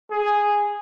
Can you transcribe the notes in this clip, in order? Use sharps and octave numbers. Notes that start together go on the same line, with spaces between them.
G#4